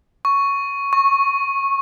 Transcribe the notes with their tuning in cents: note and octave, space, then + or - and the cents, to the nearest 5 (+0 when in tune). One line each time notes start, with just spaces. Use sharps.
C#6 +5
C#6 -15